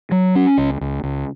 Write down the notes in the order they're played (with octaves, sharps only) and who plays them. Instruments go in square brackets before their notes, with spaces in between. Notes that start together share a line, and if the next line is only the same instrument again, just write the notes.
[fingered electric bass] F#3
C#4
C#2
C#2
C#2